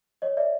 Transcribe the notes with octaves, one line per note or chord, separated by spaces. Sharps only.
C#5 D#5
D5 E5